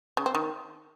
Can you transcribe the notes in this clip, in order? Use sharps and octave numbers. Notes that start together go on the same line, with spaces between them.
C#3
C4
D#3